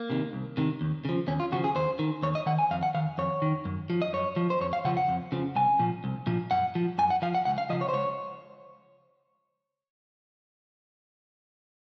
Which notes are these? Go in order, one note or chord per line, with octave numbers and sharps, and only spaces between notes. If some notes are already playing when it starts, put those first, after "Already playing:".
Already playing: A#3
C3 D#3
C2
C3 D#3
D#2
C#3 F3
D#2 C#4
F4
C#3 F3 F#4
G#4
D#2 C5
D#3
D#2 C#5
D#5
D#3 F#5
G#5
F2 F5
F#5
D#3 F5
F2 C#5
D#3
F#2
F3
D#5
F#2 C#5
F3
C5
F2 C#5
F5
C#3 F3 F#5
F#5
F2
C#3 F3
C2 G#5
A#2 F3
C2
A#2 F3
F#2 F#5
F3
F#2 G#5
F#5
F3 F5
F#5
C#2 F#5
F5
C#3 F3 D#5
C#5
C5
C#2 C#5